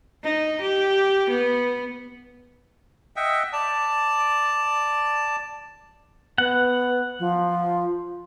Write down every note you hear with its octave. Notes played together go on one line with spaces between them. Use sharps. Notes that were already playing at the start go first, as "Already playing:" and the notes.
D#4
G4
B3
D#5 E5 F#5 G5
D5 A5
B3 F#5
F3